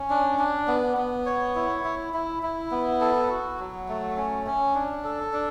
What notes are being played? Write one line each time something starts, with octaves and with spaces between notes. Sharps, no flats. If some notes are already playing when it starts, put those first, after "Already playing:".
Already playing: C#4
D4
D4
B3
B3
C#5
E4
E4
E4
E4
B3
A4
F#4
F#3
A3
C#4
C#4
D4
A4
D4